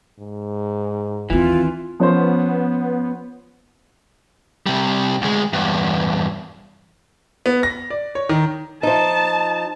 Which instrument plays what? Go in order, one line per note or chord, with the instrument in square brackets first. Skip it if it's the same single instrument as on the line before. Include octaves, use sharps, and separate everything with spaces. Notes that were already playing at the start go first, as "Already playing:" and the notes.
[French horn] G#2
[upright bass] D#2 C4 [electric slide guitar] E3 [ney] F4
[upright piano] F3 C#4 C5 [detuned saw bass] B3
[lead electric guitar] C3 G3
D2 G#3
E2 G2
[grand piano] B3
A#6
D5
C#5
D#3
[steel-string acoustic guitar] F3 D#4 [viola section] A5